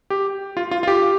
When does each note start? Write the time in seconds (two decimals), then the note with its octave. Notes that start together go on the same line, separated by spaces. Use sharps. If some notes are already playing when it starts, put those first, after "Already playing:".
0.10 G4
0.57 F4
0.71 F4
0.83 F4
0.87 G4